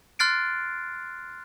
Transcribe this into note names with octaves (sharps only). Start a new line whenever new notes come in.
C6 F6 F#6 A6 C7 D7